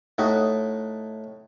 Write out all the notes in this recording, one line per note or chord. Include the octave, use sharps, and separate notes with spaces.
A2 D#4 F#4